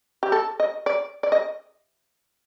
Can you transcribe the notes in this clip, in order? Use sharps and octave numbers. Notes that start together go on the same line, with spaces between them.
G4
A4
D#5
D5
D5
D#5